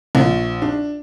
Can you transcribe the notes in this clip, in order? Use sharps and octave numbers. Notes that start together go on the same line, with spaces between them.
A#1
D4